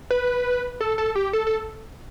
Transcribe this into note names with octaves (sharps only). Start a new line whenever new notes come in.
B4
A4
A4
G4
A4
A4